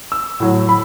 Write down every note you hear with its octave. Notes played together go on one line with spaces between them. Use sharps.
E6
A2 F#3
B5